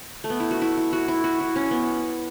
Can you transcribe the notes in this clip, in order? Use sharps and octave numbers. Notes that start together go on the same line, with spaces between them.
A3
B3
E4
F#4
E4
E4
F#4
E4
F#4
E4
C#4
B3